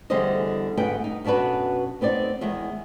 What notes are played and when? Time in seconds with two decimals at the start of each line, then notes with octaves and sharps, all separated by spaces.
0.10 E2 D3 G3 G#4 C5 D#5
0.77 D2 G#2 B3 G#4 G5
1.04 D#4
1.25 F#2 B2 D4 F#4 B4
2.01 B3 C4 D#4 D5
2.41 E2 D#3 G#3